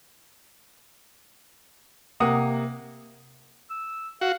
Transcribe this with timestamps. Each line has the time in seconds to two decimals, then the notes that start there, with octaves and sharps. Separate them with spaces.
2.20 C3 A#3 F#5 D#6
3.70 E6
4.21 F#4 F5